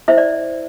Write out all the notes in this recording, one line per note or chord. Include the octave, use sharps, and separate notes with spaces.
E4 C5 E5
D5